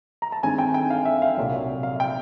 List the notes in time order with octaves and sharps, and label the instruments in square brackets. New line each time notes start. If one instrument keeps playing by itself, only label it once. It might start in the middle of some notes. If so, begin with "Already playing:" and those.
[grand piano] A#5
A5
G2 D#3 G#3 C4 G#5
G5
G5
F5
E5
F5
C2 A#2 F#3
F5
G5